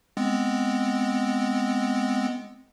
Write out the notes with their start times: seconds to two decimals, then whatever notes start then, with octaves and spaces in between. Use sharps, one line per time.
0.17 G#3 B3 C4